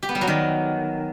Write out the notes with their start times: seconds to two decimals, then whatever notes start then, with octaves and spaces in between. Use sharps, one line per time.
0.03 G4
0.09 B3
0.15 G3
0.21 F#3
0.27 D#3